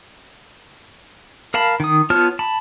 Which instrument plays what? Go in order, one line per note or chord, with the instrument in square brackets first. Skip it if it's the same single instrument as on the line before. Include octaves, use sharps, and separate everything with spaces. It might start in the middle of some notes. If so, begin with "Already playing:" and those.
[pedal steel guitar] A#4 F5 A5 B5
D#3 D#6
B3 F4 C#5 A5 F6
A5 B5